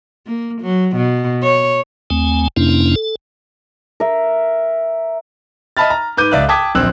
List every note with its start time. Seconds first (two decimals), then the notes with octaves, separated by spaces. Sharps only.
0.27 A#3
0.62 F#3
0.96 B2
1.42 C#5
2.10 D#2 A3 C4 G#5
2.57 F2 C3 A#3 C#4 D4 E4
2.96 A4
4.00 A#4 E5
5.77 D#5 E5 A5 B5 F6 A6
5.90 A#5
6.17 G#2 B4 D6 G6 D#7
6.31 C#2 D5 E5 F5 F#6
6.49 G5 A5 D6 D#6 G#6 B6
6.75 D1 A#1 C4 E6 F#6